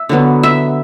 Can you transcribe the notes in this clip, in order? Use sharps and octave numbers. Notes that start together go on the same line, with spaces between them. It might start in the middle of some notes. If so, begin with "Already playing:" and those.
Already playing: E5
D3 F#3 B3
E5